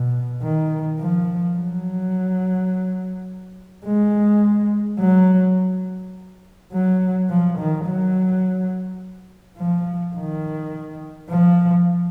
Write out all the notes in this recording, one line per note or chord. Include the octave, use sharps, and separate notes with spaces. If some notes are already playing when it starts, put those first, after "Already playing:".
Already playing: B2
D#3
F3
F#3
G#3
F#3
F#3
F3
D#3
F#3
F3
D#3
F3